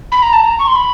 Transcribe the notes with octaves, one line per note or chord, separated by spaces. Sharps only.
B5
A#5
A5
A#5
C#6
C6
B5